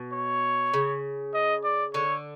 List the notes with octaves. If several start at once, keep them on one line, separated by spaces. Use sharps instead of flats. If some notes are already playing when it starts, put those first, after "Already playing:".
Already playing: B2
C#5
C#3
D#5
D5
D3 C#5